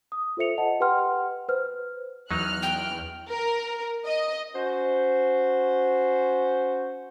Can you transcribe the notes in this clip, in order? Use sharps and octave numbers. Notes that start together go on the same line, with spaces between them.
D#6
F4 A4 C5 E5 C#7 F7
D#5 F#5 A5
G4 B4 F#5 G5 C6 F6
B4 C5 F6
E2 F#3 D#4 F6 F#6
G5
A#4
D#5
C#4 F#4 C5